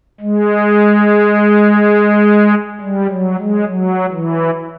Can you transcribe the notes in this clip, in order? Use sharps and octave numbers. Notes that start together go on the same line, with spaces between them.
G#3
G3
F#3
G#3
F#3
E3